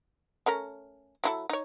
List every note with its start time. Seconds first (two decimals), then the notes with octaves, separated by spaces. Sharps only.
0.46 A3 C#4 A#4
1.24 F#3 E4 A4
1.50 D#4 C#5